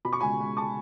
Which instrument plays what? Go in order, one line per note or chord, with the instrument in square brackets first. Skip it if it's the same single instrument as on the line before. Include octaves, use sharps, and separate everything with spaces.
[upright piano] B2 B5
C#6
C#2 G#5 B5
C#2
A5 C#6